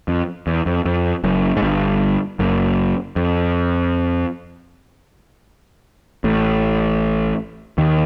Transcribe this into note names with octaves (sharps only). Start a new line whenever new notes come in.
F2
E2
F2
F2
F#1 F#2
G#2
G1 G2
F#1 F#2
F2
A1 A2
D#2 D#3